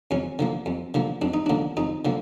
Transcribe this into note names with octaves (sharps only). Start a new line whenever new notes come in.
F2 C#4
D3 F3 A#3
F2
D3 F3 A#3
F2 D4
D#4
D3 F3 A#3 D4
F2 D#4
D3 F3 A#3